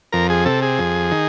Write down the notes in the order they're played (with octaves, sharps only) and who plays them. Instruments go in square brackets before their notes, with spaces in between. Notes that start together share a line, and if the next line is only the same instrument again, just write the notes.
[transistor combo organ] F2 A#4
G#4
C3 A4
G#4
F2
D#3